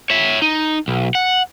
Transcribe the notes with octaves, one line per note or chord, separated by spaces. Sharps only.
C#5 E5
D#4
B1
F#5